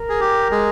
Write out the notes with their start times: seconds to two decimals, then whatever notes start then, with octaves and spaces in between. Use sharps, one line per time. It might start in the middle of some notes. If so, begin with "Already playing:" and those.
Already playing: A#4
0.09 G#4
0.21 G4
0.51 G#3 G#4